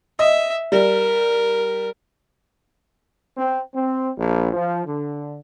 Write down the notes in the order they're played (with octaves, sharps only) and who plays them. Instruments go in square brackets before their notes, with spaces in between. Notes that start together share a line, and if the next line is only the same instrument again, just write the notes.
[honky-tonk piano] D#5 [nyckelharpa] E5
[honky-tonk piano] G3 [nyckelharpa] A#4
[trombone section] C4
C4
A#1
F3
D3